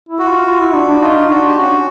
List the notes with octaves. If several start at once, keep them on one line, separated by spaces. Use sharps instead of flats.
E4
F#4
F4
F4
E4
D4
D4
D#4 F4
D4 F#4
G4
C#4 F#4